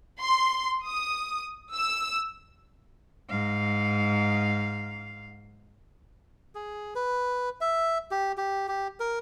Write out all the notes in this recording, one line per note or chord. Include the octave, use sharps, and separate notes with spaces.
C6
D#6
E6
G#2 F5
G#4
B4
E5
G4
G4
G4
A#4